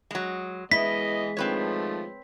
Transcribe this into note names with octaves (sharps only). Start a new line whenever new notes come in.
F#3 G#3
E3 G#3 B3 E4 D#5 B6
D#3 F3 A3 C4 B4 C#5